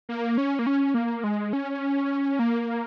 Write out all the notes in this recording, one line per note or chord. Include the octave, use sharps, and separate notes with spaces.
A#3
C#4
A#3
C#4
A#3
G#3
C#4
A#3